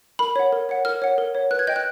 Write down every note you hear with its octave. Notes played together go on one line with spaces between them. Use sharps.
A#4 B5
C#5 F#5
A#4
C#5 F#5
A#4 F6
C#5 F#5
A#4
C#5 F#5
B4 F#6
G#6
D#5 G5 G6
F#6